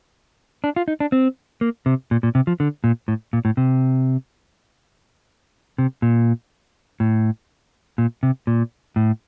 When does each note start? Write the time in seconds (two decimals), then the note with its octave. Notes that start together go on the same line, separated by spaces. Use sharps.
0.64 D4
0.76 F4
0.88 D#4
1.00 D4
1.12 C4
1.61 A#3
1.86 C3
2.11 A#2
2.23 A#2
2.35 C3
2.47 F3
2.60 D3
2.84 A#2
3.08 A2
3.33 A#2
3.45 A2
3.57 C3
5.78 C3
6.02 A#2
7.00 A2
7.98 A#2
8.23 C3
8.47 A#2
8.96 A2